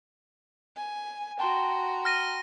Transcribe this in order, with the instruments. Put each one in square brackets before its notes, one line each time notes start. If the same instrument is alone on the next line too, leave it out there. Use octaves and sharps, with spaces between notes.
[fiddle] G#5
[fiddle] F#4 A#5 [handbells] G5 A5 C6
[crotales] F6 A#6 D#7